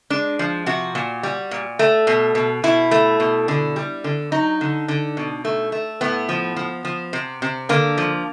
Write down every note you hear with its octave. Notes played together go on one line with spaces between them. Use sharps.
G#3 D4
F3
C3 F#4
A#2
G3
A#2
A3
B2
B2
B2 E4
A3
B2
D3
G3
D3
F#3 D#4
D3
D3
B2
A3
A3
A2 B3
F3
F3
F3
C3
C3
D3 A#3
F3